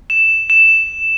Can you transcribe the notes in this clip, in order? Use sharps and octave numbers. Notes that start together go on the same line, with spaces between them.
E7
E7